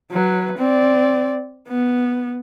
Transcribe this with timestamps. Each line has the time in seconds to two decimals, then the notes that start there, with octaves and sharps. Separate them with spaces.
0.12 F#3 B4
0.58 C4 D5
1.68 B3